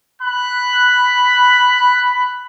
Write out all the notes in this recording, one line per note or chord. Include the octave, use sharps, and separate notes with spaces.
B5 F#6